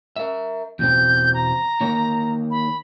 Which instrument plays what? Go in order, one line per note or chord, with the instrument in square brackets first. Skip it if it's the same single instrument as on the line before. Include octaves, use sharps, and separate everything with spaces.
[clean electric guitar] A#4 E5
[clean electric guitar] E2 B2 C4 [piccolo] G6
[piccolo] A#5
[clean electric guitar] D#3 A#3 C#5
[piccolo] B5